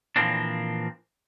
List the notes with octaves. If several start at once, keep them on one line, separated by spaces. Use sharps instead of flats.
A#2 E3 F3 A#3 C4 D4